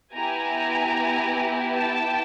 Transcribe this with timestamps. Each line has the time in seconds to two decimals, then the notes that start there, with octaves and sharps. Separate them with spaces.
0.14 B3 E4 G4 G#5 A#5
1.77 G5 A5